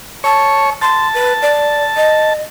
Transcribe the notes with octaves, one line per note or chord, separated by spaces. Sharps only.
C#5 A5
A5 C6
B4
D5
D#5